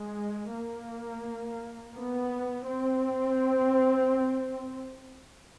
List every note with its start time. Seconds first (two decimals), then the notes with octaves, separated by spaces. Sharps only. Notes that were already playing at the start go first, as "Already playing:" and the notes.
Already playing: G#3
0.54 A#3
1.95 B3
2.66 C4